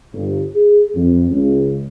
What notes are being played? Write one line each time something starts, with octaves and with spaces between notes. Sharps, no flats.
G1
G#4
F2
C#2